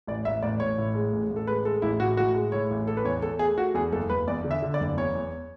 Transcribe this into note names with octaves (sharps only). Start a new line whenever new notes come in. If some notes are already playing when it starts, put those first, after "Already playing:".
A1 D5
A1 E5
A1 D5
A1 C#5
A2
G#3
A1
A1
A4
G#3 B4
G#3 A4
A1 E4
A2 F#4
A2 F#4
G#3
A2 C#5
A1
A3 A4
B4
E2 C#5
E2 A4
A3 G#4
A3 F#4
E2 G#4
F#1 A4
F#1 B4
E2 D5
D3
E5
D3
D5
F#1
E2 C#5
E2